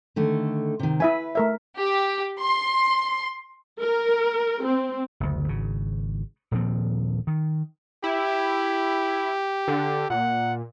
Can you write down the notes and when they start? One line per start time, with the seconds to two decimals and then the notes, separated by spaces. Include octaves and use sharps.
0.16 D3 D#3 A3
0.79 C3 D#3
1.00 E4 B4 E5 G#5
1.35 A3 A#4 E5
1.79 G4
2.40 C6
3.81 A#4
4.65 C4
5.20 F#1 D2
5.48 G#1 C#3
6.51 D#1 A#2 F3 C4
7.27 D#3
8.04 E4 G4
9.68 D3
10.10 A#2 F#5